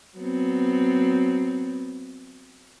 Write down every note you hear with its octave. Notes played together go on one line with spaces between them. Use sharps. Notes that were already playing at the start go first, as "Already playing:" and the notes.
F#3 B3 C4